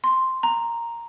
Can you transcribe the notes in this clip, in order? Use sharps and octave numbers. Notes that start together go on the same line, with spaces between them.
C6
A#5